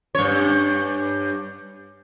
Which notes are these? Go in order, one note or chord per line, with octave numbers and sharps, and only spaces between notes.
G2 C#5